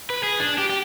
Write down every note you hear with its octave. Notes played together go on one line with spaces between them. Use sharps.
B4
G#4
D4
G4
G4